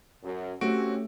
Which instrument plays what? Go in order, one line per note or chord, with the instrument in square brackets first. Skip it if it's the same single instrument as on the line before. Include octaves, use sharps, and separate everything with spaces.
[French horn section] F#2
[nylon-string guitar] A3 [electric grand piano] C4 F#4 D7 [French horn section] C#4 G4 C#5